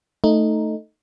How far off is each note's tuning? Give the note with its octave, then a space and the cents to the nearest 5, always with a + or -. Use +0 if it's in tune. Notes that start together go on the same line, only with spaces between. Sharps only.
A3 +5 D#4 +0